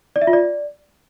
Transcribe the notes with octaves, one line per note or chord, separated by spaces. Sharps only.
D5
E5
F4
D5